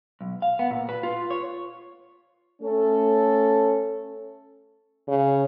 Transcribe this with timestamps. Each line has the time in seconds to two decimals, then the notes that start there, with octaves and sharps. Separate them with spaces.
0.21 B1
0.42 F5
0.59 B3
0.71 A#2
0.89 B4
1.03 F4
1.31 C#5
2.62 A3 C#4 A4
5.07 C#3